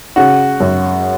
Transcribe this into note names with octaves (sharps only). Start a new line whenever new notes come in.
C#3 F#4
F#2